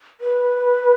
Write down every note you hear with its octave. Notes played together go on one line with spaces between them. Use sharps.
B4